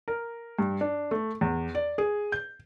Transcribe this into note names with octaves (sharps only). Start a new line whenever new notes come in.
A#4
G2
D4
A3
E2
D5
G#4
G6